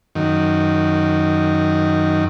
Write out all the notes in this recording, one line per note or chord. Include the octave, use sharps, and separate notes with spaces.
F#2 D#3